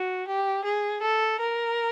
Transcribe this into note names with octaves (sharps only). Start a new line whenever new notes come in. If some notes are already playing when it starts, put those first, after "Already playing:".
Already playing: F#4
G4
G#4
A4
A#4